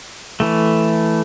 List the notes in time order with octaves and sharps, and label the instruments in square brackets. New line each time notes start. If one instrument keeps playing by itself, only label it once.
[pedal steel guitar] E3 A3